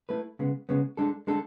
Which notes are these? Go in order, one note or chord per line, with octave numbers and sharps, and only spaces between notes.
A3 E4 B4
C#3 G#3 B3
C#3 G#3 B3
G#3 D4 A4
G#3 D4 A4